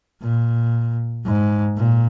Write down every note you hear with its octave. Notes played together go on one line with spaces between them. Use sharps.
A#2
G#2
A#2